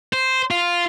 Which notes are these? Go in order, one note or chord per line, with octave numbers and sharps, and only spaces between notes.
C5
F4